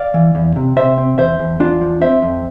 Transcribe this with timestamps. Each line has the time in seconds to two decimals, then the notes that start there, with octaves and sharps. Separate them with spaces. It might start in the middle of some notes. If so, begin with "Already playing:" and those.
Already playing: D5 F5
0.14 E3
0.35 E2
0.56 C3
0.77 C3 C5 E5
0.98 C4
1.18 E2 C5 E5
1.39 E2
1.60 E2 D4 F4
1.81 F3
2.01 C4 C5 E5
2.22 F2